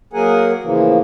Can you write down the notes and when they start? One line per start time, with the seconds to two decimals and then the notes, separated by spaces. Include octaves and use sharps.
0.13 F#3 A#3 G#4 A#4 F#5 G#5
0.63 A2 C#3 E3 F3 A#3